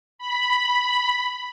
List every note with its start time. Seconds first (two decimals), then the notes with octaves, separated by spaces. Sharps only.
0.19 B5